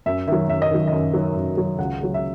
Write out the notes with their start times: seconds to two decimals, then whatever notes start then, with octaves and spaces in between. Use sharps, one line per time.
0.06 F#2 E5
0.27 D#3 F#3 E5
0.49 F#2 E5
0.62 D#5
0.71 D#3 F#3
0.88 F#2 D#5
1.13 D#3 F#3
1.36 F#2
1.57 D#3 F#3
1.79 C#2 F#5
2.00 C#3 F#3
2.14 E5